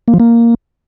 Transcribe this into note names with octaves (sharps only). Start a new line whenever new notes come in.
A#3
F3
A#3